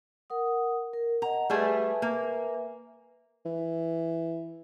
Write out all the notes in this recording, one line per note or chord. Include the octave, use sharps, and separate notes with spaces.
A#4 F#5 D#6
A#4
D#5 F#5 A#5
G3 A3 G#4 B4 E5 G#5
A#3
E3